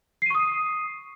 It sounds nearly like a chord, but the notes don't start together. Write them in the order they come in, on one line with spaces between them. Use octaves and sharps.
C7 D#7 C#6 D#6